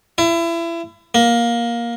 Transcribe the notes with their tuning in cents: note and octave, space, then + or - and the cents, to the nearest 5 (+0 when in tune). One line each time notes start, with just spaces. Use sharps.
E4 +30
A#3 +15